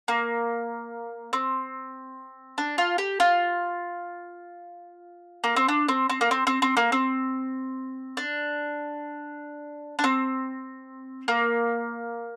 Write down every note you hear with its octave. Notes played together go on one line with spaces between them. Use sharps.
A#3
C4
D4
F4
G4
F4
A#3
C4
D4
C4
C4
A#3
C4
C4
C4
A#3
C4
D4
D4
C4
A#3